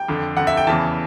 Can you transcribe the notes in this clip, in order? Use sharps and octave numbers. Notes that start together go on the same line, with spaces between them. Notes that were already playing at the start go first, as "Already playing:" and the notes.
Already playing: G5
F2 D3
F2 D3 F#5
E5
G5
E2 C#3 E3 A5